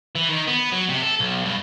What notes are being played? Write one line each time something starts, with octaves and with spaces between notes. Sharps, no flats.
E3
D#3
B3
F#3
C3
A4
B1
G2